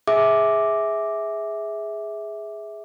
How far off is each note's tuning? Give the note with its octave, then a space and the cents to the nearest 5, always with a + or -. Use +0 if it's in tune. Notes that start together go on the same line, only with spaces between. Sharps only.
G#4 +0 E5 -15 D6 +0